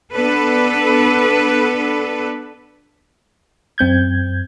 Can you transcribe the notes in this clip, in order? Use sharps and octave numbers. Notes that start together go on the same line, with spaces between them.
B3 D4 A4 B4
F#2 C4 G6 G#6